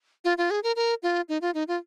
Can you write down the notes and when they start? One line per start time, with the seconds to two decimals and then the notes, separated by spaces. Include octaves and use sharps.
0.25 F4
0.38 F4
0.51 G#4
0.63 A#4
0.76 A#4
1.03 F4
1.29 D#4
1.42 F4
1.54 D#4
1.68 F4